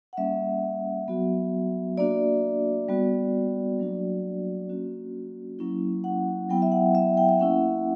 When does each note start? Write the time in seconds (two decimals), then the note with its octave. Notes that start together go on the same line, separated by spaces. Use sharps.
0.13 F#5
0.17 G3 A#3 C#4 E5
1.08 F#3 B3 F#4
1.98 A#3 D4 F#4 D5
2.89 G3 B3 F#4
3.79 F#3 A#3 D4 F#4
4.69 A#3 C#4 F#4
5.59 F#3 A#3 C#4 E4
6.04 F#5
6.49 F#3 B3 E4 G5
6.62 E5
6.72 F#5
6.95 E5
7.17 G5
7.29 E5
7.40 A#3 C#4 E4 F#5